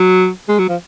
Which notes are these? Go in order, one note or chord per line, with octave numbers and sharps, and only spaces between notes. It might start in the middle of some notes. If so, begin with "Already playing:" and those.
Already playing: F#3
G#3
F#3
F3